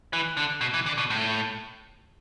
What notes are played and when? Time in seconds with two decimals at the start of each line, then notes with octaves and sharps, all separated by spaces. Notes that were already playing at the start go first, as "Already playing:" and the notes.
0.13 E3
0.37 D3
0.61 B2
0.74 E3
0.86 D3
0.98 B2
1.10 A2